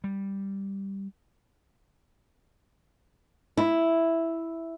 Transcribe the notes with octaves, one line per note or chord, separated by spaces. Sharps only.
G3
E4